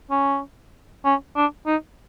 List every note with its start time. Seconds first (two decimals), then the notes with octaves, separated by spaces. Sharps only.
0.11 C#4
1.05 C#4
1.36 D4
1.66 D#4